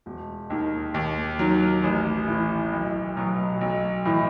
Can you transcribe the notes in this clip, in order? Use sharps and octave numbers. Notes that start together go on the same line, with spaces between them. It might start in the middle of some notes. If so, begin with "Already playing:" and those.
E1
D#2 D#3
D#2
D#3 F#3
A1
A2 E3
B1
B2 F#3
B1
A2 E3